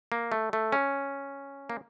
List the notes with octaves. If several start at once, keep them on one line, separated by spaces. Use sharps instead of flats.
A#3
A3
A3
C#4
A#3